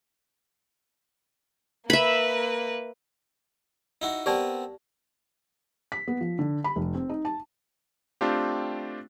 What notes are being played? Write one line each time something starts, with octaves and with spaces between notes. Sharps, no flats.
A#3 B4 E5 B5
D#4 E4 F#4
B3 C4 G4 A#4 D5 A5
B6
B3
F3
D3
B5
F1
C4
D#4
A5
A3 C4 D4 F4 G4